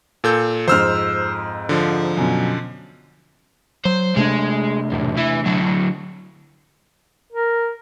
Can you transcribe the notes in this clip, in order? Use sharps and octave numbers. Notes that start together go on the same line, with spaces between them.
A#2 A4 G6
F2 G#2 C5 E6 F6
D3 F3
F#2 B2
F#3 C5
C3 G#3 A3 D4
B1 E2
E3 E4
D3 F#3
A#4